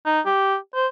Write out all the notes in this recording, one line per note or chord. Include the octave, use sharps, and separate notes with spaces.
D#4
G4
C5